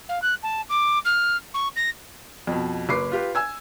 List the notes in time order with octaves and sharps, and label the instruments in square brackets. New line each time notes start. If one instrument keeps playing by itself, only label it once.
[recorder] F5
F#6
A5
D6
F6
C#6
A#6
[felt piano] F2 B2
F#1 B4 D6 C7
F4 G4 B4
G#5 E6 G#6